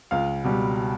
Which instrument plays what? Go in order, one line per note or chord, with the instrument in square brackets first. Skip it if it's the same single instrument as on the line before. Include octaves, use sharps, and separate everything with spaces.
[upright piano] C#2 F5
B2 G3